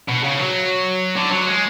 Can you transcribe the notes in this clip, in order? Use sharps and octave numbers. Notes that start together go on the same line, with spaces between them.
B2
C#3
F#3
D3
F#3
G#3